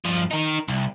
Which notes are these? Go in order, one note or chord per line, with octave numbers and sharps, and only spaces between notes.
G2 F3
D#4 A#4
C2